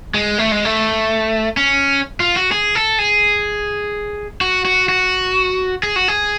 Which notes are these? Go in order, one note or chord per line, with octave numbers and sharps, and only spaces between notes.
G#3
A3
G#3
A3
C#4
F4
F#4
G#4
A4
G#4
F#4
F#4
F#4
G#4
F#4
G#4